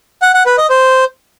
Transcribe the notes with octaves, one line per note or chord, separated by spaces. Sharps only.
F#5
F#5
B4
D#5
C5